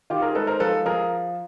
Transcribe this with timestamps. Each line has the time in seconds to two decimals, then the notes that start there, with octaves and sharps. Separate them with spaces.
0.10 D#3 F4 G4
0.22 G#4 A#4
0.35 G#3 A4 B4
0.47 A#4 C5
0.60 F3 A4 B4
0.85 F3 G#4 A#4